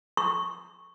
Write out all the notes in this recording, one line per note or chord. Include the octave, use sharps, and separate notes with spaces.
C#6